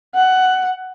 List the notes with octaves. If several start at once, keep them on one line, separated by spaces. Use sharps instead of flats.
F#5